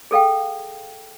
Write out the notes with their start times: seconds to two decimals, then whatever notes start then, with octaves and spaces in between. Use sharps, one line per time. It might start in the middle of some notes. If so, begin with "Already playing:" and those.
0.11 G#4 A4 F5 G5